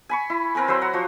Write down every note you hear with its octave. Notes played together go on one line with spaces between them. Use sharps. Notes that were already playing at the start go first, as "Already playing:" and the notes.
G#5 B5 C#6
E4
C4 A#4 B4 G#5
F#3 B4 C5 E5
F#5 A#5
F3 F#4 C5